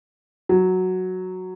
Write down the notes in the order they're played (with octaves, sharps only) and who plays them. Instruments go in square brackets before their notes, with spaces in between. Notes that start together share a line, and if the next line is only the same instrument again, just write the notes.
[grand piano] F#3